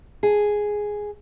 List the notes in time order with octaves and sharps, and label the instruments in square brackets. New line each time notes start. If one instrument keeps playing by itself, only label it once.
[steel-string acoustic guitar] G#4